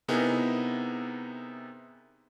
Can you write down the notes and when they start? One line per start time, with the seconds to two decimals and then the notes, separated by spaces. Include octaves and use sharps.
0.08 C3 B3 D#4 E4 G#4 A#4